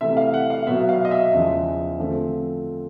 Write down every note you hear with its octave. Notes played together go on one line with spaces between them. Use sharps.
C3 E3 A3 E5
F5
F#5
F5
B2 F#3 B3 E5
F5
D#5
E5
E2 C#3 F3 G#3
D3 F3 A3 C4